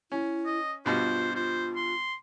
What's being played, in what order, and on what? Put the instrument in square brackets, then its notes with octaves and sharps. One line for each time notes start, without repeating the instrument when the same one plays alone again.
[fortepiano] C#4 [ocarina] E4
[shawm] D#5
[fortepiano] G2 B2 [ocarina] F4 [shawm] C5
[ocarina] F4 [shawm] C5
[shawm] C6